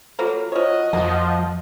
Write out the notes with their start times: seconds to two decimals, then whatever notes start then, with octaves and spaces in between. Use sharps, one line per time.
0.19 F3 F#3 A#3 A4
0.52 F3 F#4 C#5 D#5
0.93 F2 F3 A#3